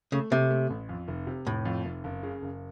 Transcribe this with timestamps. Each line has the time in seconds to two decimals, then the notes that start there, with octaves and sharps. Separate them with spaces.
0.12 C#3 A3
0.31 C3 A3
0.50 A3
0.70 A1
0.89 F2
1.08 F1
1.27 C3
1.47 F1 A2
1.65 F2
1.85 F1
2.04 F#1
2.23 C#3
2.42 F#1